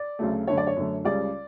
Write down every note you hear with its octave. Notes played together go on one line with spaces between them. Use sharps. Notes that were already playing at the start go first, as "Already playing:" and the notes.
Already playing: D5
D2 C#3 F#3 A3
F#2 D3 A3 C#5
D5
C#5
F#2 D3 A3
C#2 C#3 G3 D5